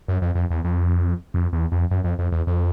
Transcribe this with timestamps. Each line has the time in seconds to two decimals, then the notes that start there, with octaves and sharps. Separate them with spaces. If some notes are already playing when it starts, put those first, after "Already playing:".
0.08 F#2
0.22 F2
0.35 F2
0.51 E2
0.64 F2
1.34 F2
1.53 E2
1.72 F2
1.91 F#2
2.04 F2
2.19 F2
2.32 E2
2.47 F2